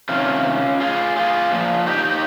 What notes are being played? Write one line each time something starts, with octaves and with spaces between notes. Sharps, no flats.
C3 D#3 C#4 F4
F4 G#4
F4 G#4
A#2 F3
D#4 G4